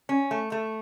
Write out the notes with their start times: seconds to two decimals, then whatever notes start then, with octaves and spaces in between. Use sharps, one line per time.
0.09 C#4
0.31 A3
0.52 A3